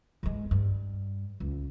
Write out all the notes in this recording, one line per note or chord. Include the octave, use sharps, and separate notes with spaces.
G2 G#3
G2
C#2